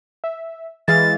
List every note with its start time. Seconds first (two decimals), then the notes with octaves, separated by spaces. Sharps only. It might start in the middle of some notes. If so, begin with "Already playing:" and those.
0.24 E5
0.88 E3 G#3 F5 A6